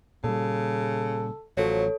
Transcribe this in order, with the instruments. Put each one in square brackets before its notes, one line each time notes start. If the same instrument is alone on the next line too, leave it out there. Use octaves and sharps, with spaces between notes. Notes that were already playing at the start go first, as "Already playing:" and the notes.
[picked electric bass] A#2 G3 [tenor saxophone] C#3 [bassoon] A4
[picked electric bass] A1 [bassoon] F3 [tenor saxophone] F#3 [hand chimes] A4 C#5